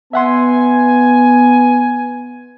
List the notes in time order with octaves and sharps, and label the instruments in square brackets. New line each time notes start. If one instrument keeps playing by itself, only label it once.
[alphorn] B3 [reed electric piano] E5 F#5 C6 [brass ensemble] G#5